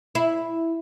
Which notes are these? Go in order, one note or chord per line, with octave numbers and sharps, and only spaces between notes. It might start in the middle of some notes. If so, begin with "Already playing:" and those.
E4